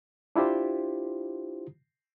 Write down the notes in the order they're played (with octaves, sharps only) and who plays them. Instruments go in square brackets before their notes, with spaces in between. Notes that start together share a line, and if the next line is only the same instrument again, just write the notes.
[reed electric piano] D4 E4 F4 G4 C5